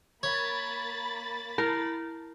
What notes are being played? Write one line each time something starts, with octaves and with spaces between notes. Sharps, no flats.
A#3 C#5 B5 A6
E4 A#4